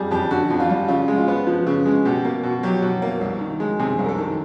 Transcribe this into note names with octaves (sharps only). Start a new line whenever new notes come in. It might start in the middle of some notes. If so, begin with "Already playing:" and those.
Already playing: F2 G3 G4 G#4
F2 G4
D3 F#4
F2
F4
G3
C#3 F4
G#3
F4
B3
F3
C#3
G#3
B2 G4
A#3
B2
F#3 G4
B2
A#3
C2
D#3
G#3
C3 G#4
C2
A#4
A4
D#3